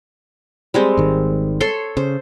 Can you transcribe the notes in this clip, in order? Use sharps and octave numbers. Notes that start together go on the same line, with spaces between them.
G3 G#3 C4
G#1 D#3
A4 C#5 C6
C#3 C5